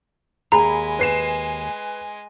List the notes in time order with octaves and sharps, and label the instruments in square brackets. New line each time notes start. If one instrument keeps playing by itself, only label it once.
[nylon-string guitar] D#2 G#4 [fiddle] G#3 G#5 [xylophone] A#5 [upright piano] B5
[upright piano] B4 C7 E7